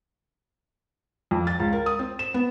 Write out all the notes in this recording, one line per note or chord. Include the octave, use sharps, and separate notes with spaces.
F2
A6
C#2
A#4
D#6
C4
E7
B3